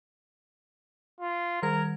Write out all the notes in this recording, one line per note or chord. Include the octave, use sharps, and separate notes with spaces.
F4
D#3 G3 A#4 G#6